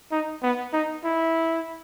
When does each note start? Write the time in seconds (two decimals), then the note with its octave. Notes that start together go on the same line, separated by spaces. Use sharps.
0.12 D#4
0.43 B3
0.73 D#4
1.04 E4